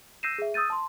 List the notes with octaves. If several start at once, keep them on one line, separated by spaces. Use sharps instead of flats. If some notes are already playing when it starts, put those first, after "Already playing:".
E6 G6 A#6 C7 D#7 E7
G#4 E5
D#6 E6 G6 A6 D#7
A5 C6